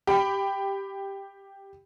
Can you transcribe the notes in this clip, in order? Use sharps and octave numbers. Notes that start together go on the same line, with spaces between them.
G4 B5